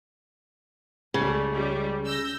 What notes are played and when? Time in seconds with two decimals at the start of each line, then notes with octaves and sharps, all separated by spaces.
1.14 C#2 C#3 G3 A3
1.52 C#2 G3
2.05 E6 G6 A#6